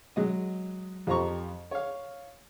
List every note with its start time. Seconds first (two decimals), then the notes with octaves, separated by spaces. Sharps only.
0.16 F#3 G#3 D#5
1.07 F2 F3 G4 C5 A#5 C#6
1.71 C#5 F5